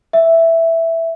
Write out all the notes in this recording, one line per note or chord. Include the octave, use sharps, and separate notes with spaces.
E5